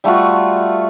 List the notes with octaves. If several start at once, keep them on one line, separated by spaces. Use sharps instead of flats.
G3 A3 F4 F#4